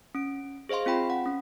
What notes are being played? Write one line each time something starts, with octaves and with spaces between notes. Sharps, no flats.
C#4 D7
G#4 C5 D#5 F5 C6
C4 F4 G5 B5
F#5
C#4